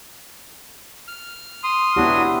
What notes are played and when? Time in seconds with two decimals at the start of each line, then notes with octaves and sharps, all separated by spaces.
1.08 F6
1.64 C6 D#6
1.96 F#3 B3 D4 E4 F#4 G4